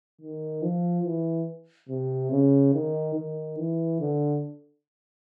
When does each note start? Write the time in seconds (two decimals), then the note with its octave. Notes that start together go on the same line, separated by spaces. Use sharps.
0.21 D#3
0.62 F3
1.06 E3
1.89 C3
2.31 C#3
2.74 D#3
3.15 D#3
3.58 E3
4.00 D3